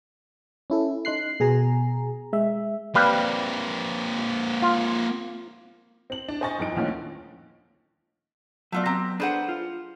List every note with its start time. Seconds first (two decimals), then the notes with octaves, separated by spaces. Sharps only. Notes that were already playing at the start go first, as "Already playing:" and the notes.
0.70 C#4 E4 A4
1.05 D#4 C6 F#6 C7
1.40 B2 G#4 G#5 A#5
2.33 G#3 E5
2.95 G3 A#3 C4 B4 F5
4.62 F4
6.10 C4 F#7
6.28 D4
6.41 C5 D#5 G#5 C#6 A6 A#6
6.58 G1 F2 D#4 D7
6.76 D2 D3 D#3 F3 A#3 C#4
8.72 F#3 A3 B3 F4 D5
8.86 C4 G4 A#5
9.20 D4 G#4 A4 B4 C5 F#5
9.49 F4